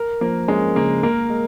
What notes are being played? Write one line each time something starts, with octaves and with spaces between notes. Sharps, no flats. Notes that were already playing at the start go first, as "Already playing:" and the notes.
Already playing: A#4
F3 A#3
G#3 C#4
C#3 A#3
A#3 A#4
G#3